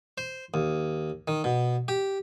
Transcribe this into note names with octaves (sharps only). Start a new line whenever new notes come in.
C5
D#2
D#3
B2
G4